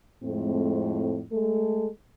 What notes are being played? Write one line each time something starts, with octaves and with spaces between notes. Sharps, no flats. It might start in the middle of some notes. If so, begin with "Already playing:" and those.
F2 A2 G#3 A3 C4
G#3 A3 A4